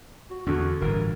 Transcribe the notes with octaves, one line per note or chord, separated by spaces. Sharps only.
F#4
E2 D3 F#4
G1 A2 E3 A#4